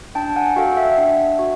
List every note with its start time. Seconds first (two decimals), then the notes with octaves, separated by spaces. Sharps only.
0.15 D4 G5 A5
0.36 F#5 G#5
0.56 F#4 A4 F5 G5
0.77 E5 F#5
0.98 D4
1.39 F#4